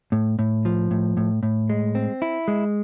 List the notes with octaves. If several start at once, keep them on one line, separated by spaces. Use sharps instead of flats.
A2
A2
F3
A2
A2
A2
G#3
C4
E4
G#3